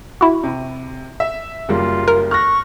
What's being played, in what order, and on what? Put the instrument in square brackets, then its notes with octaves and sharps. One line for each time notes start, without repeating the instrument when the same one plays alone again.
[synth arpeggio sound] E4 F#4
[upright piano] C3
E5
[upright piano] F#1 G3 A#3 [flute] F4
[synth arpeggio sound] A#4
[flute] C#6 [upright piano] F6 F#6 A#6